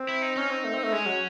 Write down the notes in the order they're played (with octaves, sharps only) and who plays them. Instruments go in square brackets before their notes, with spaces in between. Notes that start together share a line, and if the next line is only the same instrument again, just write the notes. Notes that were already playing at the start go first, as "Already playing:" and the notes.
Already playing: [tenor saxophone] C4
[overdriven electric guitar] E4
D#4
[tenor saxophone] C#4 [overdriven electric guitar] D#4
[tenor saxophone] C4
A3
C4
A3
[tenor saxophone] G#3 [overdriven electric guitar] C#4
[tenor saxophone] F#3